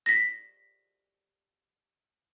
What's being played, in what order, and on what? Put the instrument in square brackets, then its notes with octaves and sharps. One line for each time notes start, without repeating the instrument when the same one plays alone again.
[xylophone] A#6 B6